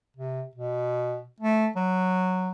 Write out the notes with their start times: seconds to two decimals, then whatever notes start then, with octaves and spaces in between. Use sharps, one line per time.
0.17 C3
0.56 B2
1.40 A3
1.76 F#3